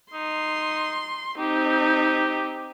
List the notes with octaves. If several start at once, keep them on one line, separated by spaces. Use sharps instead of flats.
D#4 C6
C4 D#4 G4